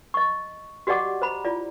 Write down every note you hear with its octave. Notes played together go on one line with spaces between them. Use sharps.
D#5 C#6
F#4 G4 D5 D#5 F#5 D6
C5 A#5 B5
E4 F4 D5